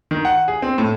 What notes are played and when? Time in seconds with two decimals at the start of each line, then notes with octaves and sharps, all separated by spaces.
0.11 D#3
0.25 F#5
0.48 G#4
0.62 C4
0.78 A2